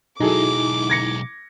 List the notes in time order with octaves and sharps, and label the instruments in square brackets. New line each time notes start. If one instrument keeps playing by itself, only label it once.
[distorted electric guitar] B1 G#3 [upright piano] F#3 G#4 A4 [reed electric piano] D#4 E4 [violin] D6
[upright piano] G#6 A#6 C#7